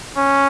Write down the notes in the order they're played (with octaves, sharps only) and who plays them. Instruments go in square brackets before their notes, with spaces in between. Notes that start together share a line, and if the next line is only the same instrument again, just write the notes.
[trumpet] C#4